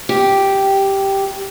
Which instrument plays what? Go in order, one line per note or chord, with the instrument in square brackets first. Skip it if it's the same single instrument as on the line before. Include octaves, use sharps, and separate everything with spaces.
[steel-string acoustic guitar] G4